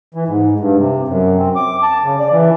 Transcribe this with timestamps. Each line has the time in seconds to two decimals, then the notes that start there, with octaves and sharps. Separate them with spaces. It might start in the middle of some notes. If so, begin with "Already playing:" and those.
0.14 E3
0.28 G#2
0.60 G2
0.76 C3
1.08 F#2
1.38 C4
1.56 D6
1.83 A5
2.03 C#3
2.19 D5
2.32 E3